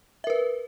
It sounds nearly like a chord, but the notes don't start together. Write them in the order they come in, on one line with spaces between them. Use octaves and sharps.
E5 A#4 B4